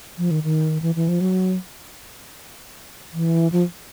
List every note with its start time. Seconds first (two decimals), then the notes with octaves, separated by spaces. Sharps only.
0.18 F3
0.31 D#3
0.43 D#3
0.82 E3
0.95 E3
1.08 F3
1.21 F#3
3.13 E3
3.52 F3